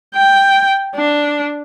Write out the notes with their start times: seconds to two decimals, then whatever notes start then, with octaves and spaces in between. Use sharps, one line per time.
0.15 G5
0.96 D4